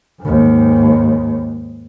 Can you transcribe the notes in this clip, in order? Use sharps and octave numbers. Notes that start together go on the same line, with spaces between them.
D#2 G#2